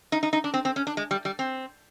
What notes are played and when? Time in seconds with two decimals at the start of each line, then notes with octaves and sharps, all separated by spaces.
0.12 D#4
0.23 D#4
0.33 D#4
0.44 D4
0.54 C4
0.65 C4
0.76 C#4
0.87 D4
0.97 G#3
1.11 G3
1.25 G3
1.39 C4